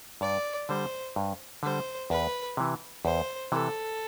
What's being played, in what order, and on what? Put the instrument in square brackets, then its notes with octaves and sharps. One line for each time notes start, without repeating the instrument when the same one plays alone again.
[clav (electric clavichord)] G2 [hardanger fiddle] D5
[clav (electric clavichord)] D3 G3 [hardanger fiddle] C5
[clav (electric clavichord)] G2
[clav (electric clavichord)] D3 G3 [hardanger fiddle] C5
[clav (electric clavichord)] E2 [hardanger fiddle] B4
[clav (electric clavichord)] C3 E3
[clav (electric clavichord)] E2 [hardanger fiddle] C5
[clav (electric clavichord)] C3 E3 [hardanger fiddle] A4